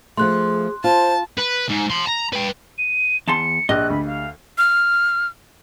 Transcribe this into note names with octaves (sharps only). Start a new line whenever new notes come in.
F3 A3 G#4 C6 F#6
F4 C5 A5
B4
G#2
A5 C6
A#5
B4 G5
D#7
E2 A5 C6 C#7
A#1 G4 D#5 F#6
D2 B5
F5
F6